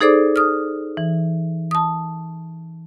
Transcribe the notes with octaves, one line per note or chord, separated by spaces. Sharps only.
D#4 G#4 A4 C5 D5 D6
D#6 F6
E3
A5 D#6